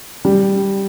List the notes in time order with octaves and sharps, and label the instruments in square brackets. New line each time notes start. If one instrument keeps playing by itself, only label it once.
[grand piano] G3